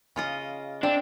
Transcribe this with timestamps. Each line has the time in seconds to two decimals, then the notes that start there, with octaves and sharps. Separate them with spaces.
0.16 C#3 F4 D#5
0.83 C4 D4